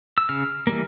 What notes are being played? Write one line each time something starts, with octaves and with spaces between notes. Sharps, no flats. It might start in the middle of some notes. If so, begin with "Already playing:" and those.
E6
C#3 F6
E3 G3 A#3